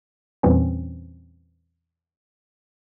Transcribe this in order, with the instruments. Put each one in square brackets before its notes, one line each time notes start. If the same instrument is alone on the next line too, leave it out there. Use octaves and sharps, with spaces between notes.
[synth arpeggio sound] E2 A#2 E3 G3 C4 C#4